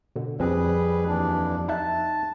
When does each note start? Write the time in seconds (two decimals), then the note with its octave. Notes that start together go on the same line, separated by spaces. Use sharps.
0.16 B2 D3
0.40 F2 F3 G3 C4 G#4 B4
1.08 D#2 E3 D4
1.68 D#4 E5 A5 F#6